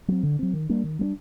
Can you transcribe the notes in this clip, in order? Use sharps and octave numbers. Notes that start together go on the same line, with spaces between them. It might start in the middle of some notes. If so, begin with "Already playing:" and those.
F#3 C4
D3
F#3 C4
D#3
G3 A#3 D4
D#3
G3 A#3 D4